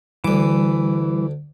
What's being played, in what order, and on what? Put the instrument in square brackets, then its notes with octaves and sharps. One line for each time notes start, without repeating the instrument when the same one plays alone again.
[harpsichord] D2 D6 [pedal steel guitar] E3 [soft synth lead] G3